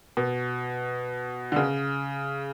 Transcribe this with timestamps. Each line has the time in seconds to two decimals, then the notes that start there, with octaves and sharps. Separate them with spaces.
0.17 B2
1.52 D3
1.56 C#3